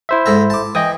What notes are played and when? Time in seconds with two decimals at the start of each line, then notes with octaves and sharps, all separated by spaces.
0.09 E4 C5 E5
0.26 G#2 A4 A#5
0.50 A5 D6
0.75 E3 D#5 G5 D#6